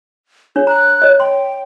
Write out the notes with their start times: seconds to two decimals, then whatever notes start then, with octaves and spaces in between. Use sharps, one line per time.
0.56 D4 G#4 C#5
0.67 A#5 F#6
1.02 C#5 D#5
1.20 G5 C6